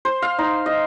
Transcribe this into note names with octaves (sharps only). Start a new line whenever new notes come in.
C5
F5
D#4
D#5